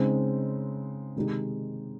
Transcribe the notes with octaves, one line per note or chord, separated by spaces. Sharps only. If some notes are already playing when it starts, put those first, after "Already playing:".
Already playing: C#3 G#3 C4 D#4
C3 D#3 G#3 D#4 G4